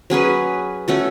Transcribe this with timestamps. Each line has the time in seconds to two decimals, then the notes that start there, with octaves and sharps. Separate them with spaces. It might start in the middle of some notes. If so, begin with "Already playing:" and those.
0.10 F#3 C#4 G#4 B4
0.88 A3 C#4 F#4 A4